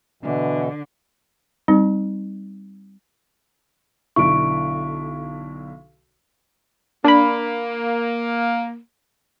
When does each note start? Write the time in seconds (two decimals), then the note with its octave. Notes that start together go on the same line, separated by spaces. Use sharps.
0.23 B2 D3 E3
1.68 G3 C4 D#4
4.16 B1 D3 E4 C#6 D7
7.04 A#3 D4 B5